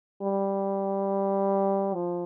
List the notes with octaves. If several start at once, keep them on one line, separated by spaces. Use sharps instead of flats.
G3
F3